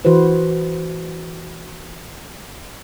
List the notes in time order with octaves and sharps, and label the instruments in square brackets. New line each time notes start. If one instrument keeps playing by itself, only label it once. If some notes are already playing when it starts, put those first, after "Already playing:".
[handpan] E3 F#4 B4 C5